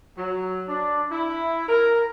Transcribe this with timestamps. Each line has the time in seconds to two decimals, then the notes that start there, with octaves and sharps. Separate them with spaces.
0.17 F#3
0.68 D4
1.11 E4
1.68 A#4